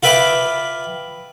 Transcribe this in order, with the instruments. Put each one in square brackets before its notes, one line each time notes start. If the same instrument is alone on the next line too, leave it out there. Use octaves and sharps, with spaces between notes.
[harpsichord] F4 B4 E5 G5 B5 D6